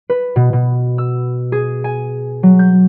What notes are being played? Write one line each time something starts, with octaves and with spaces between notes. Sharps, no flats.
B4
B2
B2
E6
G#4
G#5
F#3
G6